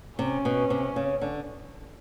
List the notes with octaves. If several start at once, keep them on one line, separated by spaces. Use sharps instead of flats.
C3 C#4
B2
C3
C#3
D3